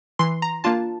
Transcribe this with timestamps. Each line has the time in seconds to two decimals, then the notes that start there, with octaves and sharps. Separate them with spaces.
0.19 E3 C6
0.42 A#5
0.64 A#3 D4 F4 A5